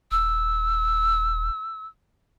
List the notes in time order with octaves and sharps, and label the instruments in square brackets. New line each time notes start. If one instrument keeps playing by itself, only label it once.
[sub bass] D#1 [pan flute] E6